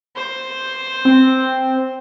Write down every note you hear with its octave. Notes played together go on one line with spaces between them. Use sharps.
C5
C4